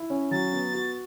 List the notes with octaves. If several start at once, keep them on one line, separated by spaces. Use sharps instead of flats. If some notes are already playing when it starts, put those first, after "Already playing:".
Already playing: E4
C#4
F#3 A6
B3
F#4